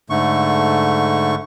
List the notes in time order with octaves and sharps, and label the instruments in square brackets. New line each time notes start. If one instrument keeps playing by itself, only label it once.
[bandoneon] G#2 D3 A3 C#6